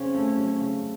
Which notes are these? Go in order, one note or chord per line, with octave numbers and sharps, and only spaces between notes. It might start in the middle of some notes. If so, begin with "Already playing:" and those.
Already playing: C#3 C4 C#4
A3
F#3
C#3